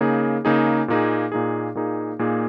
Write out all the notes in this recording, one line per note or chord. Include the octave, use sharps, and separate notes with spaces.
C#3 A#3 D#4 G#4
C#3 A#3 D#4 G#4
A#2 A#3 D#4 G#4
A#2 A#3 D#4 G#4
A#2 A#3 D#4 G#4
A#2 A#3 D#4 G#4